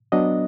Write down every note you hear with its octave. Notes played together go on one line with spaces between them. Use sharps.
F#3 B3 D4 D#5